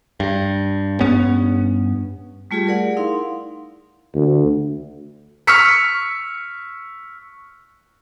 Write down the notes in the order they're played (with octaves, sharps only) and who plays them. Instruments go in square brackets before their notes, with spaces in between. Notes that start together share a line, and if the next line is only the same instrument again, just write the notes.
[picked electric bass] G2
G2 B3 C#4
[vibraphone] G3 A3 F4 G4 G#4
G#4 A#4 D5 F#5
D#4 E4 F5 C6
[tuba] D2
[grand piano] C#6 E6 F6 B6 C#7